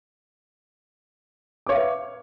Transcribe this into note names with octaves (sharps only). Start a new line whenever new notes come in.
B4 C#5 E5 F5 D6